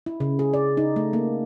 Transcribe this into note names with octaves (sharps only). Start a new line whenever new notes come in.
E4
C#3
G#4
D5
D#4
A3
A#3